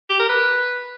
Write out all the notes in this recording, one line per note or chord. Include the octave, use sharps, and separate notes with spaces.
G4
A#4
B4